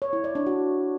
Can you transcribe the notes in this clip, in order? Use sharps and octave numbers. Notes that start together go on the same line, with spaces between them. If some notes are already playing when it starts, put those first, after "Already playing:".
C#5
E4
D5
D4
F#4